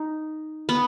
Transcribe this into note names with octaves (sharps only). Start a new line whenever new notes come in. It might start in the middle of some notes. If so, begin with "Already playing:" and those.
Already playing: D#4
B3